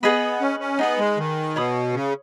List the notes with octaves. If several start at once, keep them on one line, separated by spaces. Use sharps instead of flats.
B3 G#4 B4 D#5 B5
C#4
C#4
B3 D#4 G#4 B4
G#3
D#3
B2 C#5 B5 D#6
C#3